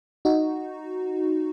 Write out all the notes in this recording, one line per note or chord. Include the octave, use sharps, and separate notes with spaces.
D#4 F#4